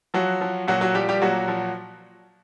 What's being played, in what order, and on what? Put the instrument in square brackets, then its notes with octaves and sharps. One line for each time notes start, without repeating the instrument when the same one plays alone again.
[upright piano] F3 F#3 F#4
F3
A#2 F#3 F#4
F#3 F#4
F3 G3 G4
G3 G4
A#2 F#3 F#4
F3